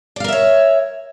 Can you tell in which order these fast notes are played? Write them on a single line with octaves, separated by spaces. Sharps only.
D5 F5 A#4 E5 C#5